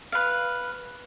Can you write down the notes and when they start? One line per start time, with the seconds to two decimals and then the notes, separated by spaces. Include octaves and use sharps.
0.12 B4 F5